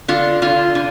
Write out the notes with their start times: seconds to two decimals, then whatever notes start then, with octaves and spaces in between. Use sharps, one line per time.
0.08 D3 F4
0.42 D3 F4
0.75 D3